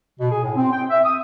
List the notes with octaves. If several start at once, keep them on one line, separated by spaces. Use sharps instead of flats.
B2
G#4
A2
C4
G5
E5
D#6